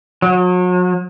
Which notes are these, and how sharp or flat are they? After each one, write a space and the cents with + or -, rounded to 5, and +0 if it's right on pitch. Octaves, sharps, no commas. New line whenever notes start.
F#3 -40